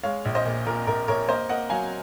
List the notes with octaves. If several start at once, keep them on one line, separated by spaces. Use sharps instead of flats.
G#3 C#5 F5
A#1
C5 D#5
A#2
A#2 A#4
A#1 A#4
A#1 A#4 C#5
A#3 C5 D#5
A#3 D#5 F#5
F#3 F5 G#5